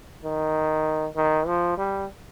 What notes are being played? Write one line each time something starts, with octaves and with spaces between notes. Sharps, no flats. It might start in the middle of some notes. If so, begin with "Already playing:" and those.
D#3
D#3
F3
G3